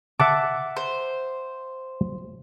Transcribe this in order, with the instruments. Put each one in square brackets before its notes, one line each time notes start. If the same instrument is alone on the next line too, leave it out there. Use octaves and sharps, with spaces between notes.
[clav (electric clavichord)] E5 F#5 A5 [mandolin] D6
[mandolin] C5